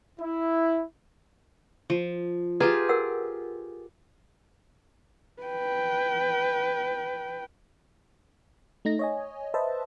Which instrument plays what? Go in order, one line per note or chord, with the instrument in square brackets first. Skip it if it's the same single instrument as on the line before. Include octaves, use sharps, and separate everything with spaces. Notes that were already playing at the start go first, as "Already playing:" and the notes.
[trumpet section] E4
[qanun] F3
[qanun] F4 G4 G#4 [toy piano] B4 F#5 A#5
[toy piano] A#4 F#5 E6
[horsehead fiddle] B4 G5
[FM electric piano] A3 D#4 A#6
C#5 D#5 G#5
B4 C5 D#5 E5 A5